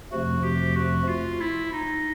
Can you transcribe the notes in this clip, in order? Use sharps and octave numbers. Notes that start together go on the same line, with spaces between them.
F2 C3 F3 A3 F#4
G4
F#4
F4
E4
D#4